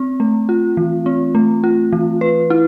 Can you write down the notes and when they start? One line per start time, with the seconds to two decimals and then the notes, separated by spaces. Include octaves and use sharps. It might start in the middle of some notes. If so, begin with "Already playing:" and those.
Already playing: C4
0.20 A3
0.49 F4
0.77 E3
1.06 C4
1.35 A3
1.64 F4
1.93 E3
2.21 B4
2.50 E4